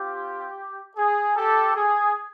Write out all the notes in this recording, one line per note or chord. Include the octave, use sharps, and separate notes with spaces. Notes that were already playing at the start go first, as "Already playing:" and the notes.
Already playing: C4 F4 G4
G#4
G4 A4
G#4